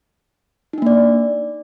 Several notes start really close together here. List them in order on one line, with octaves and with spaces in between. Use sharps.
D#4 D4 A#3 D5